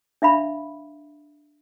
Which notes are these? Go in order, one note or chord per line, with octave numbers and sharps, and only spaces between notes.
D4 E5 F5 B5